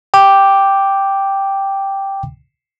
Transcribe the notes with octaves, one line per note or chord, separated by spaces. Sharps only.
G5 D6